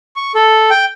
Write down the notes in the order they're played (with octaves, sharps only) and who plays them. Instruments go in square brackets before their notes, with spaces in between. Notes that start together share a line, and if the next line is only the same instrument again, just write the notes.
[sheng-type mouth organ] C#6
A4
G5